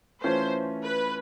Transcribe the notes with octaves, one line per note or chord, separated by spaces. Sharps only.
E3 A3 C#4 F4 C5
B4